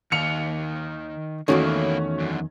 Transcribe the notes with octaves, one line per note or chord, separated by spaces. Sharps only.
D#2 D#3 F5 C#7 F7
E2 G#2 D#3 A3 A#3 C#4 E4 F#4
F#2 D3